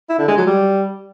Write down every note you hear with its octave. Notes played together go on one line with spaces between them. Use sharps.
E4
D3
G#3
F#3
G3